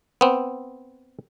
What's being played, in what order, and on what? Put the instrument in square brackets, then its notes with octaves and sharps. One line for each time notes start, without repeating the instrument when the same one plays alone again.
[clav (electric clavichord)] B3 C4